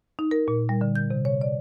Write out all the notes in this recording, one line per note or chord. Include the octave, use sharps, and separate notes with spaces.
D#4
A#4
A#2
G3
D3
G6
C3
C#5
D5